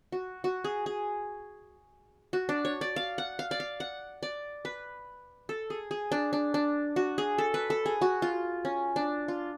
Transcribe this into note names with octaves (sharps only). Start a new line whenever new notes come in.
F#4
F#4
G#4
G#4
F#4
D4
C#5
D5
F5
F#5
F5
D5
F5
F#5
D5
B4
A4
G#4
G#4
D4
D4
D4
F#4
G#4
A4
B4
A4
G#4
F#4
F4
C#4
D4
F4